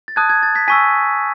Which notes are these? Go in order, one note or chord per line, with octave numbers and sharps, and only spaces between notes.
A6
A5 D#6 F#6 G#6
G#6
A6
G#6 B6
G#5 C#6 E6 B6 D#7